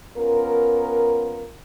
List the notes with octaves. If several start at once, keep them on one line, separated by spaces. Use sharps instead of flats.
B3 C#4 F4 A#4